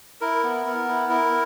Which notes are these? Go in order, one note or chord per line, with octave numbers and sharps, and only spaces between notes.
E4 A#4
B3
B3
E4
E4